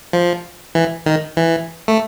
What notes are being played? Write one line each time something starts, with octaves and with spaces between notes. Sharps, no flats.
F3
E3
D#3
E3
A3